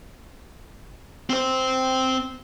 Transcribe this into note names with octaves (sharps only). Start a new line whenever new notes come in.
C4 C5